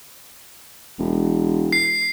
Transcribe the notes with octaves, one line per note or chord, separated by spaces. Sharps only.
E1
C7